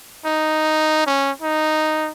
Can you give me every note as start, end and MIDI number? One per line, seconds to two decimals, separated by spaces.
0.24 1.03 63
1.07 1.31 61
1.42 2.10 63